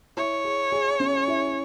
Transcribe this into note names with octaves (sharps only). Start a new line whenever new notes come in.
E4 C#5
G#4
G#4
C#4
E4